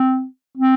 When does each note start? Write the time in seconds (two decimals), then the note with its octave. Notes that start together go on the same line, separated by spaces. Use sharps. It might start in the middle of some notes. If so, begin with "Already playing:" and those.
Already playing: C4
0.57 C4